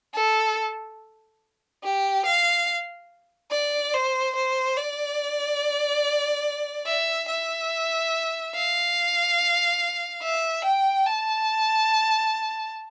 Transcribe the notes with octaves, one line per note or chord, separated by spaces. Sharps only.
A4
G4
F5
D5
C5
C5
D5
E5
E5
F5
E5
G5
A5